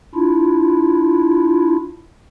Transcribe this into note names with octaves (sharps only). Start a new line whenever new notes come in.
D4 E4 F4